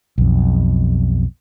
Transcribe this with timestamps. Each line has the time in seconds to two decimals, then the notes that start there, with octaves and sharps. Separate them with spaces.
0.18 B1 F2